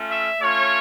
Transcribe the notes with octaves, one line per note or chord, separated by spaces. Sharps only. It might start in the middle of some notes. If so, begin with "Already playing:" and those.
Already playing: A3 C#4 F4
E5
A3 C#4 F4 C#5